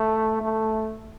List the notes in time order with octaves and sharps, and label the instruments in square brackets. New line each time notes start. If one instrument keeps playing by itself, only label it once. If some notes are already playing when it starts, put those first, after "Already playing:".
Already playing: [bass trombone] A3
A3